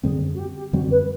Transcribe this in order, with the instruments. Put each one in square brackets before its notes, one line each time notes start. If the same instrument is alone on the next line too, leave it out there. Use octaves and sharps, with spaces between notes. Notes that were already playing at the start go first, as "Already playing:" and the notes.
[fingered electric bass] F#2 D3 G3 C4 [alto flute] G#4
[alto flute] F#4
G4
G4
[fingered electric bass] F#2 D3 G3 C4 [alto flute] F#4
[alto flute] B4